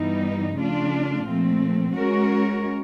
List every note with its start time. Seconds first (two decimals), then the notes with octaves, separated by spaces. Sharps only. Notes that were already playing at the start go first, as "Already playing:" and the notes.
Already playing: G2 E3 G3 B3 D#4
0.55 C#3 F3 A3 D4 F4
1.26 A#2 F3 A3 C4
1.97 G#3 C#4 F#4 A#4 C#5